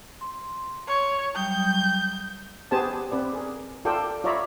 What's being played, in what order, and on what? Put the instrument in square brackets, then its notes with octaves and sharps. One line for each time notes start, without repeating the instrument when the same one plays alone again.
[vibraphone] C6
[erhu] C#5
[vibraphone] F#3 G3 D#6 [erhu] G6
[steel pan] B3 G4 G#4 C5 G#5 A5
C4 B4 D5
G#4 A#4
F4 A4 A#4 D5 G5
F4 C#5 D5 E5 A#5 B5